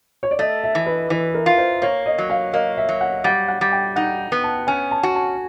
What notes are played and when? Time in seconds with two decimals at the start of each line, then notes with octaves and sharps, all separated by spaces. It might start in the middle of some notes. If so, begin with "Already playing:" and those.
0.23 C#5
0.31 D5
0.39 A3 D#5
0.64 E5
0.75 E3
0.86 B4
1.10 E3 B4
1.35 A#4
1.46 F4
1.58 C5
1.82 A#3 C#5
2.06 D#5
2.18 F#3
2.30 F5
2.53 A#3 D#5
2.77 E5
2.89 F#3
3.01 F#5
3.24 G3 F#5
3.48 F#5
3.61 G3
3.73 G5
3.96 D#4 F#5
4.32 B3
4.44 A5
4.67 C#4 G#5
4.91 A5
5.03 F#4
5.15 A5